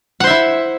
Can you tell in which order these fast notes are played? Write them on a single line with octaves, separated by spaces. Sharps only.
F#5 C5 E5 E4